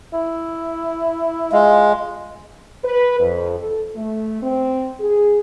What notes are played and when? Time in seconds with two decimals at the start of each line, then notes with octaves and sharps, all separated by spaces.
0.13 E4
1.52 G#3 F4
2.84 B4
3.19 F2
3.59 A4
3.96 A3
4.42 C4
5.00 G#4